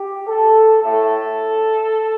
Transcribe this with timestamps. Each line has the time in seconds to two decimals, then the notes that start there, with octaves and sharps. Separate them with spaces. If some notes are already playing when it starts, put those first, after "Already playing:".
Already playing: G4
0.27 A4
0.81 A2 A3 A4